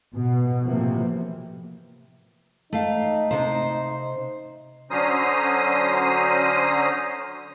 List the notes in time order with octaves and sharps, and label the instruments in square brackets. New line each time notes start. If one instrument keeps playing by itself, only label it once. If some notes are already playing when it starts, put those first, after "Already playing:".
[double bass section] B2
A2 C3 E3 F3 A#3
[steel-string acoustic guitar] A3 F5 [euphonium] D#4
[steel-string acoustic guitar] C3 C5
[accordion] D3 F#3 C#4 C5 A#5 D#6